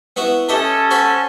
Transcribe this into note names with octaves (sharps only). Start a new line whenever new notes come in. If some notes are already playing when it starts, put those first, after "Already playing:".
B3 E4 F#4
C#4 G4 A4 D#5 E5
F#4 C5 B5